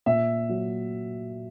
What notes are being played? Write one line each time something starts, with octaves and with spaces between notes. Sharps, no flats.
A#2 E5
F#3